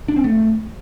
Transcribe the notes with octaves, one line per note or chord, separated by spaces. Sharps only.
D4
C4
A3